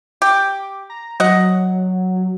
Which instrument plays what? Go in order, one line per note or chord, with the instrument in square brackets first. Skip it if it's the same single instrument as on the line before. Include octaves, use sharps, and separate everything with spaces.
[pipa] G4 [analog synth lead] D6
[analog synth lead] A#5
[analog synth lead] F#3 [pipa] D#5 F#5